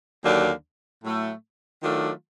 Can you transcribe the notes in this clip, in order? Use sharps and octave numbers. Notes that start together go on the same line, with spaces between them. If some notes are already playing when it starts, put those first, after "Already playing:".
D#2 D3 F#3 A#3 D4
A2 F#3 A3
D#3 F#3 A3 D4 F4